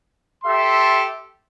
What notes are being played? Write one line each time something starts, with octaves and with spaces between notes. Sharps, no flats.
G4 A4 E5 C6